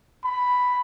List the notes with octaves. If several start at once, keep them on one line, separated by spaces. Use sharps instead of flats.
B5